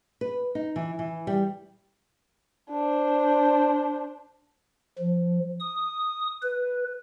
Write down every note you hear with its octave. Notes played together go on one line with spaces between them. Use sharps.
B4
D#4
E3
E3
G3
D4 C5
F3
D#6
B4